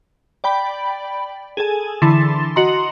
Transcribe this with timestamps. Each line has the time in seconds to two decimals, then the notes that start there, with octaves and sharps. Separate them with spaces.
0.44 D5 G5 B5
1.57 G#4 A4 G#5
2.02 D3 E3 E4 C6 A6
2.56 F#4 D#5 A#5 C6